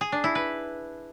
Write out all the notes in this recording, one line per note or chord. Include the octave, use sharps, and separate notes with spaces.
G#4
D4
E4
B4